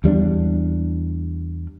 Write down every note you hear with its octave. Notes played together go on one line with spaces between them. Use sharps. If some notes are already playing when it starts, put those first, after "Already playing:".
E2 G3 C#4 D4